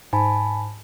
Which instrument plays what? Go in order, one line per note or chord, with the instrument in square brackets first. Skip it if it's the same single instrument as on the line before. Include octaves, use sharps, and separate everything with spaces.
[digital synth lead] G#2 [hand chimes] G#5 A5 B5